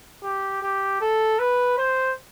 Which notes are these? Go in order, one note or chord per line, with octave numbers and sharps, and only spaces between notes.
G4
G4
A4
B4
C5